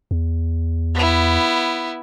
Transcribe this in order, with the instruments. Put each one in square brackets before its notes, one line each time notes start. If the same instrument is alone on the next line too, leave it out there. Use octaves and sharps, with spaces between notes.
[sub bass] E2
[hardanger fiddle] B3 E4